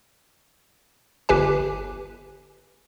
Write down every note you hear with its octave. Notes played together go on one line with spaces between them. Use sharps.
G1 G4 B4 G#5